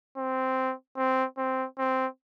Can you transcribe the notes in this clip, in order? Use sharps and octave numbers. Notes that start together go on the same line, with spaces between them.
C4
C4
C4
C4